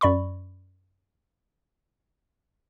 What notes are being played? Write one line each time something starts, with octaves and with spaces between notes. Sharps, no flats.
F#2 D5 B5 C#6